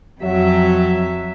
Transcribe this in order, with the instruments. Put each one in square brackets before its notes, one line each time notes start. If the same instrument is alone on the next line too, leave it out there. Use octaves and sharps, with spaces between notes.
[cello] F2 E5 [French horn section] F#3